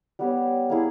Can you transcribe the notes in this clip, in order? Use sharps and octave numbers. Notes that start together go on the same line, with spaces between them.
G3 B3 G4 C#5
A#3 E4 G#4